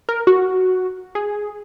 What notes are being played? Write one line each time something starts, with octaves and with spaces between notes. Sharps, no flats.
A#4
F#4
G#4